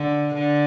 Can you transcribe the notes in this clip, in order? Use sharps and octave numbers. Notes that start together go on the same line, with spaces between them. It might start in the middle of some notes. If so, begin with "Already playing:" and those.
Already playing: D3
D3